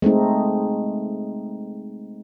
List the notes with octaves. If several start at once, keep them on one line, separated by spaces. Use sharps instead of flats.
G#3 A3 C4 D#4